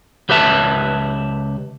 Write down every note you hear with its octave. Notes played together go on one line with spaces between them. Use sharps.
C#2 G4 B4 E5 A5